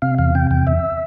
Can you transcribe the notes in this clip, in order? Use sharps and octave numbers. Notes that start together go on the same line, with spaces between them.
C3 F5
E2 F5
C3 G5
E2 G5
E2 E5